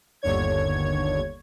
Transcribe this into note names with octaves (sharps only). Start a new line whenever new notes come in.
G1 D#2 D3 C#5 G#6